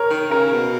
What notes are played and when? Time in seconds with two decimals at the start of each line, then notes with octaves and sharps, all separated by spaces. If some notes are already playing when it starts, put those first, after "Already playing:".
Already playing: A#4 C#5
0.10 D#3
0.31 C#3 A#4
0.52 B2